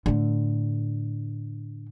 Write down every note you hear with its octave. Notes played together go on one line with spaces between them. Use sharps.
A2 D3